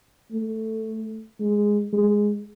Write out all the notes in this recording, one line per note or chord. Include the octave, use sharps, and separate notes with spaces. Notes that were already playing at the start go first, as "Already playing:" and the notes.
A3
G#3
G#3